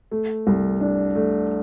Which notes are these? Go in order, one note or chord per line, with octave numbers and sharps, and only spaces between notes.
A3
C2
D4
A3